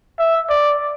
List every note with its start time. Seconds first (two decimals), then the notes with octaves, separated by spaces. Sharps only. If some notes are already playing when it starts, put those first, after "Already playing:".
0.19 E5
0.49 D5